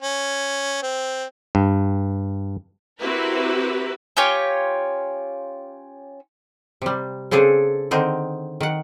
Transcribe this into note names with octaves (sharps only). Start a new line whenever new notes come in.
C#4
C4
G2
C4 E4 F#4 G4 A#4 B4
C#4 F4 G4 C#5
C3 G3
C#3 C4 D4 G#4 A4
D3 D#3 C4 D#4
D#3 F#5